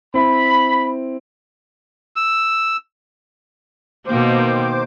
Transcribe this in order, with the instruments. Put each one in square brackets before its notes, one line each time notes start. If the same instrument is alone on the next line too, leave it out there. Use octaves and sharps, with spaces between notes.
[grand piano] C4 E4 [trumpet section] B5
[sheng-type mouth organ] E6
[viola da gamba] B2 A#3 [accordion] D#3 C5 D6